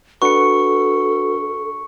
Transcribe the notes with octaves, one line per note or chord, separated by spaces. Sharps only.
D4 F#4 A4 B4 C#6 C#7